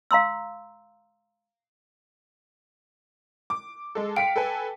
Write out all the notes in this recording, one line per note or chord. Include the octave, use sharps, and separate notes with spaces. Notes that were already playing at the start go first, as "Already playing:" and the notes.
F5 A#5 C6 E6
D6
G#3 A4
F5 G5 B6 C#7
A4 B4 G#5